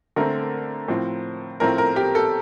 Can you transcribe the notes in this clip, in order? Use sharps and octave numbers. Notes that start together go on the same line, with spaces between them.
D3 A3 C4 A#4
A2 F3 C4
A2 F3 A3 C4 A#4
A#4
G4
A4